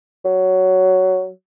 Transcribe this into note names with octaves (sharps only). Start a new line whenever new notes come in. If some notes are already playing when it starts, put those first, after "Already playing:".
F#3